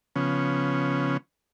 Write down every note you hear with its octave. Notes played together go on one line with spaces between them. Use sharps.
C#3 F3 B3 C#4